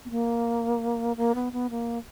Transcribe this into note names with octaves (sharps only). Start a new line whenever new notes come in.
B3
A#3
A#3
B3
B3
A#3